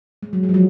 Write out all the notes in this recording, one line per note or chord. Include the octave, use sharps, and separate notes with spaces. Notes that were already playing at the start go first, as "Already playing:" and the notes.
G#3
F#3
G#3
F3
F#3